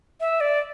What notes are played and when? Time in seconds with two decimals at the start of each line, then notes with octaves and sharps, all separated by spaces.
0.20 E5
0.41 D5